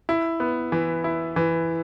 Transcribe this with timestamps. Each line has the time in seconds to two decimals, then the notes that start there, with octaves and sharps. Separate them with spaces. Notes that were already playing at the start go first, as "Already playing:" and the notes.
0.09 E4
0.40 B3
0.72 E3
1.04 E4
1.36 E3